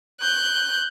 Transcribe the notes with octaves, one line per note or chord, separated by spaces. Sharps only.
F#6 G6